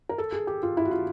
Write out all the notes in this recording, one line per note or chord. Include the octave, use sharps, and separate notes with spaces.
A#4
A4
G#4
G4
F4
E4
F#4
F4